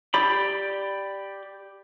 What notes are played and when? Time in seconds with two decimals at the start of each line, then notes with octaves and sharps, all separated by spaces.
0.14 G4 D5 B5